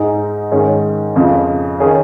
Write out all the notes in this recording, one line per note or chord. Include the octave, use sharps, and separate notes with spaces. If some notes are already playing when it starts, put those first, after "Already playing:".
Already playing: G#2 G#3 D#4
G#2 D#3 C#4 G#4 C#5
F2 C#3 F3
D#3 C#4 G#4